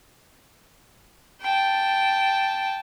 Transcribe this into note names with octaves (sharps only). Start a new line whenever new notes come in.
G5 A5